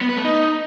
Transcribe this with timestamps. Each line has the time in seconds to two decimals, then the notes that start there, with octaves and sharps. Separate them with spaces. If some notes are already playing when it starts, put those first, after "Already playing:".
0.01 B3
0.09 B4
0.17 A3
0.24 D#4